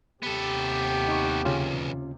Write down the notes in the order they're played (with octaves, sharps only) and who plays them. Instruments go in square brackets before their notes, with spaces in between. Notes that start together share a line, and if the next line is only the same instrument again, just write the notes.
[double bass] D#2 C3 [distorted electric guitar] B3 A4 [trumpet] G4
[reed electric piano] D#4 C#6
[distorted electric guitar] B1 E2 [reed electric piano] C#3 C#4 F4